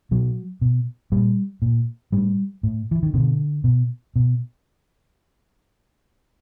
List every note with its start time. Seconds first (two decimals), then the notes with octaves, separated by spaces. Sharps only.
0.11 B2 F#3
0.61 B2
1.12 A#2 G3
1.62 A#2
2.12 A2 G3
2.63 A2
2.91 E3
3.03 D#3
3.14 B2 D3
3.64 B2
4.16 B2